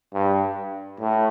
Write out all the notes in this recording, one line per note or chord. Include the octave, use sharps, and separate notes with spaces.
G2
A2